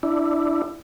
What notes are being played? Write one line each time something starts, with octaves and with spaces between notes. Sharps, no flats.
D4 E4